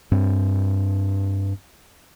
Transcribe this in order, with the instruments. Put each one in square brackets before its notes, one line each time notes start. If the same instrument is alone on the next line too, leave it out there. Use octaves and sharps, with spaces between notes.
[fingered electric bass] G2 C4